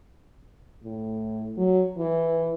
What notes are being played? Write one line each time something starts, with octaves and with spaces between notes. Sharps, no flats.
A2
F#3
E3